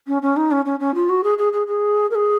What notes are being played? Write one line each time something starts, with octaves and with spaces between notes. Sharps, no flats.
C#4
C#4
D#4
C#4
C#4
C#4
F4
F#4
G#4
G#4
G#4
G#4
A#4
G#4